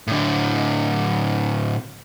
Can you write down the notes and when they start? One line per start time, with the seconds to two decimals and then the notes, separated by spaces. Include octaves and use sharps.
0.07 A2 D3